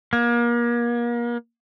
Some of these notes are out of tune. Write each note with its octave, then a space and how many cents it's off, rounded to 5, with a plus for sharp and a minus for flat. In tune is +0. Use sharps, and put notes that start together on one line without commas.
A#3 +35